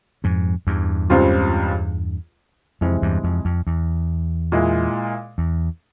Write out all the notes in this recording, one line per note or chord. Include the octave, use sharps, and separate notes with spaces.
F2 G#2
E2 G2
C#2 C#3 G3 C4 F4
F2 C3 E3 G#3 C4 E4
E2 G2
F2
F2
E2
A#2 G#3 E4
E2